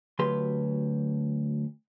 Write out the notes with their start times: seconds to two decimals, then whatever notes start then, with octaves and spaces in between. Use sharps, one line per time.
0.19 D2 F#3 G4 B4 C6